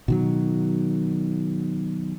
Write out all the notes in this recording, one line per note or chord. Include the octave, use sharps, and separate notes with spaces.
B2 D#3 F#3